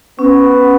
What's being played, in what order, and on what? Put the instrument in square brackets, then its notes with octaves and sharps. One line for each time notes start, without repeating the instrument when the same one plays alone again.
[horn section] B3 [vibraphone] C#4